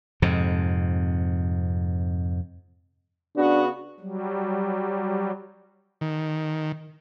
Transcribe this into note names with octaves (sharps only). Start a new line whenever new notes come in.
F2 G#2 C3
C#3 B3 D4 F#4
F#3 G3
D#3